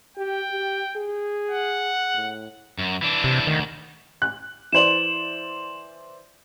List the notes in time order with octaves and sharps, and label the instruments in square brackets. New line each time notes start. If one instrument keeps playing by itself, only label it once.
[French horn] G4 [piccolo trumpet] G5
[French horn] G4
G#4
[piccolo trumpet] F#5
[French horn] A2
[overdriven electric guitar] F#2
E3 D4
[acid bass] C3
[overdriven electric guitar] D2 [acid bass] D#3
[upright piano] F#6
[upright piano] E3 C5 D5 [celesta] E7 F#7